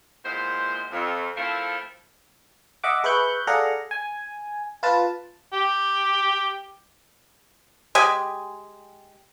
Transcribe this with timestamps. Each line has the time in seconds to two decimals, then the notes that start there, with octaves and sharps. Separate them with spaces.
0.23 E2 A#2 G#3 C5
0.91 F2
1.36 F3 A3 C4 E4 A4 A#4
2.83 D#5 E5 F#5 D6
3.04 G#4 B4 E5 C#6 F#6 G6
3.47 G#4 A4 D5 F5 F#5 A#5
3.91 G#5
4.83 F4 B4 A5
5.53 G4
7.95 G#3 G4 D#5 G#5